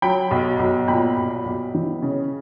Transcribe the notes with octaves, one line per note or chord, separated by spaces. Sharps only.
F#3 G5 B5
B1
B1
A#2 G5 B5
B1
B1
E3
C#3